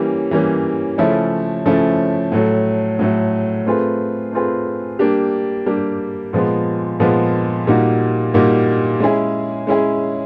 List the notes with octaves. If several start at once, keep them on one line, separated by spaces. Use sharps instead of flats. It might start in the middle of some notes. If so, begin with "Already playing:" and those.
Already playing: E3 G3 A#3 C#4
E3 G3 A#3 C#4
C#3 F3 A3 C#4 E4
C#3 F3 A3 C#4 E4
A2 F#3 A3
A2 F#3 A3
A3 C4 F4 G#4 B4
A3 C4 F4 G#4 B4
G3 A#3 D4 G4
G3 A#3 D4 G4
A#2 F3 G#3 B3
A#2 F3 G#3 B3
A#2 G3 A#3 D#4 F#4
A#2 G3 A#3 D#4 F#4
G#3 C#4 E4 G#4
G#3 C#4 E4 G#4